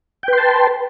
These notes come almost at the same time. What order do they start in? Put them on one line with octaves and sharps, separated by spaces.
G5 B4 C6 A5